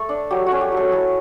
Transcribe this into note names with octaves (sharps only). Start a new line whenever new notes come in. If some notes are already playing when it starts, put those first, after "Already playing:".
Already playing: A3 A4
D4
F#3 G4
F#4
C#4
G4
F#3 A4
E4 A4